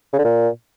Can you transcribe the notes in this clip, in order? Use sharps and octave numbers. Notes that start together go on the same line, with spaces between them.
C#3
D3
A#2